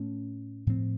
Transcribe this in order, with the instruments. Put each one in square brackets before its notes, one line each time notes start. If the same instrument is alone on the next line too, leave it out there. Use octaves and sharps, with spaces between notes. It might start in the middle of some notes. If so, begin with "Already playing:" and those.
Already playing: [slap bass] A2 A3 C#4
A2 F3 C4